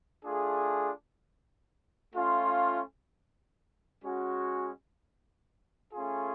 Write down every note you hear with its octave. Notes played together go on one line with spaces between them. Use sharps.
A3 D4 F4 G#4
A3 C#4 F4
G#3 C#4 F#4
A3 C#4 F4 G#4